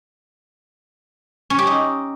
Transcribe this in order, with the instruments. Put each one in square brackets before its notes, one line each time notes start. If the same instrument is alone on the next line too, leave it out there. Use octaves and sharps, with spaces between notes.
[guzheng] C#4
G4
D#4